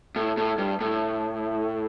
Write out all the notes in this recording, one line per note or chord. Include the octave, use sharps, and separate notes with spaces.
A2
A2
G2
A2